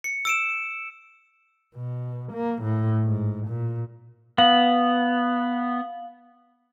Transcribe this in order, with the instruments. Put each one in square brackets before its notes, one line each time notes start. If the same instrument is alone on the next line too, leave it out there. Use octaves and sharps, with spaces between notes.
[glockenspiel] C#7
E6 D7 E7
[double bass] B2
A#3
A2
G#2
A#2
[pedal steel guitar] B3 [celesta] F5 F#7